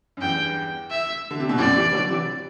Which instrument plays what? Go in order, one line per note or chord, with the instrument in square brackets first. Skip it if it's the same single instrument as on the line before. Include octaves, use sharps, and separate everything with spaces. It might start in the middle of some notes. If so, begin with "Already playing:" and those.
[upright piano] F#2
[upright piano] E2 G2 [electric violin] G5
[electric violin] E5
[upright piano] D3
C3
B2
[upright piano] F#2 A2 [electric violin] D5
[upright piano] E3 G3
D3 F#3
C3 E3